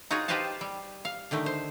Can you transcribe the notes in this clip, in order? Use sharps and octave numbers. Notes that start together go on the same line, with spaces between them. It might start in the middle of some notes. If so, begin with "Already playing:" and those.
D#4 F4 F#4 G#4 C#5
G4 B4 C5 D#5 F5 A5
G3
F5
D3 D#3 A3 D#4
C5